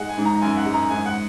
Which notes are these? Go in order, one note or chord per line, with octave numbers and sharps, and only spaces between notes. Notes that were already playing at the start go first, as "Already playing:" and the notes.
Already playing: G#2 G#3 F#5
G#5
G#2
A#5
F#2 G#5
F#5
G#3
A#5
G#2 G#5
F#5